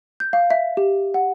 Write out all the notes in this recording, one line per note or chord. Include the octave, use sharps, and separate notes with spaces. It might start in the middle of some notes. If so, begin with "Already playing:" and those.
G6
F5
E5
G4
F#5